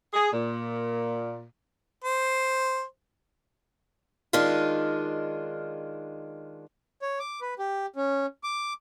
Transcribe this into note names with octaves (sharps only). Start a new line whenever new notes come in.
G#4
A#2
C5
D#3 G#3 D4 F4
C#5
D6
B4
G4
C#4
D6